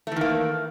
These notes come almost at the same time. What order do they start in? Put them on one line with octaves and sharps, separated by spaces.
A3 E3 D#3 A#3